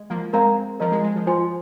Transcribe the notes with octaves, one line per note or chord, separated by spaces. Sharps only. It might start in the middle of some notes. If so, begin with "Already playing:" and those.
Already playing: G#3
F3 A#3
G#3 C4 A#4 F5 A#5
F3 A#4 D#5 A#5
G#3
G#3
F3
F3 F4 C5 G#5 C6